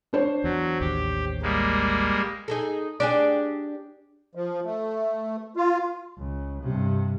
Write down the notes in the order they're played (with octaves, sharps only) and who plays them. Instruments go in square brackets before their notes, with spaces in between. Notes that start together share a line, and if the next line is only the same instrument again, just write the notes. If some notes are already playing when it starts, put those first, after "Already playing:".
[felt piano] D4 C5 C#5
[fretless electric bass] E2 [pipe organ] F#3
[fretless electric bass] A1 D#2 [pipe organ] G4
[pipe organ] G3 G#3 A#3
[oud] D#4 G#4 A4
D4 G4 G#4
[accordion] F3
A3
F4
[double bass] C#2
G2 C3